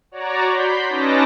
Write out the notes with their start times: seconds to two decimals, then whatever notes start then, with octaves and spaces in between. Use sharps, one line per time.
0.11 F#4 C#5 D5 A#5
0.47 B5 C6 G6 B6
0.88 C#4 D#4 B4 A5 D6 A#6